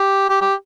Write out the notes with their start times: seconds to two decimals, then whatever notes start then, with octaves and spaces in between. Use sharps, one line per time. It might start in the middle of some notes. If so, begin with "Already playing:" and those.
Already playing: G4
0.29 G4
0.41 G4